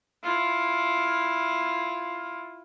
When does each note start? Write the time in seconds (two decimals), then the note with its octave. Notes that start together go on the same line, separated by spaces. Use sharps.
0.23 E4 F4